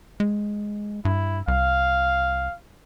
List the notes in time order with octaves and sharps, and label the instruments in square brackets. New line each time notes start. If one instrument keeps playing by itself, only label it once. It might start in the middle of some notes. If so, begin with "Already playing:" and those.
[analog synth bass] G#3
[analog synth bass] G2 [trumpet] E4
[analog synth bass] C2 [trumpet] F5